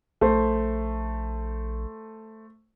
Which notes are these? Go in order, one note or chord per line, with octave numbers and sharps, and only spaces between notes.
A#1 A3 C5